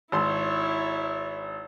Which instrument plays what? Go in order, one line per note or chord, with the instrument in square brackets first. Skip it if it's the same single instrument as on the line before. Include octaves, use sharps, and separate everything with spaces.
[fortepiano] G#1 C6 [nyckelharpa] E4 C#5